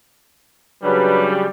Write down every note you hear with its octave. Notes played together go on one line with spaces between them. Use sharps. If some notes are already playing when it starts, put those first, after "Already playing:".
C#3 F#3 G3 D4 B4